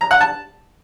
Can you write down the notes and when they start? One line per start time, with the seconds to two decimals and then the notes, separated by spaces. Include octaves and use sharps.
0.01 A#5
0.11 F#5
0.21 A5